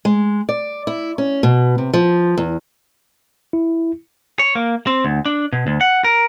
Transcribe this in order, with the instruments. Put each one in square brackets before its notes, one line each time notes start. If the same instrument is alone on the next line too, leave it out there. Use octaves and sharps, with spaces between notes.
[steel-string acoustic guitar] G#3
D5
E4
C#4
B2
C3
F3
E2
[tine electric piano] E4
[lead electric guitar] C#5
A#3
C4
D2
D4
B2
D2
F#5
A#4